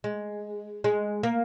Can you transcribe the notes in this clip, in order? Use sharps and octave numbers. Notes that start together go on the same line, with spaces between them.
G#3
G#3
A#3